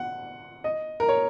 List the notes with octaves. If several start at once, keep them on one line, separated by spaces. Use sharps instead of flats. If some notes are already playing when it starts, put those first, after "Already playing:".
Already playing: F#5
D#5
A#4
C#5